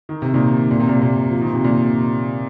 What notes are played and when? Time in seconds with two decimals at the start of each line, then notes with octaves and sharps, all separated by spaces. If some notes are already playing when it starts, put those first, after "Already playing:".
0.09 D#3
0.22 C3
0.34 A#2 D#3
0.71 A#2
0.80 C3
0.89 A#2
1.02 A#2
1.31 F3
1.42 D#3
1.54 C3
1.64 A#2